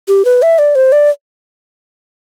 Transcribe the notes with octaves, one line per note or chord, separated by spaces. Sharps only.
G4
B4
E5
D5
C5
D5